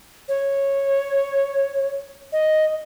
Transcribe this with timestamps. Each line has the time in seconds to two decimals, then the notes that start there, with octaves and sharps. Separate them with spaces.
0.29 C#5
2.33 D#5